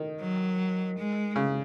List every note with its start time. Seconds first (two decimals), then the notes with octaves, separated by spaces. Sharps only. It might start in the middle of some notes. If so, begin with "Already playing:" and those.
Already playing: D#3
0.20 F#3
0.97 G#3
1.36 C#3